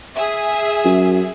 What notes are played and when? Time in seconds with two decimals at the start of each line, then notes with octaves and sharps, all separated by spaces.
0.16 G#4 E5
0.85 F#2